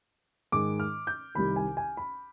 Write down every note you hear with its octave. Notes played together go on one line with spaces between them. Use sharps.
G#2 D#3 G#3 D6
F6
G6
C2 C3 D#3 B5
G#5
G#5
B5